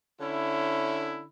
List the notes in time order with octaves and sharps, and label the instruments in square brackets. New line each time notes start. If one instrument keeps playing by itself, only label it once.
[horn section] D3 C#4 E4